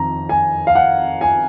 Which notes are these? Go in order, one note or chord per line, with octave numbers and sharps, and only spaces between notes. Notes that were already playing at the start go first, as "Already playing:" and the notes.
Already playing: F2 D#3 A#5
G#5
F5
F#5
G#5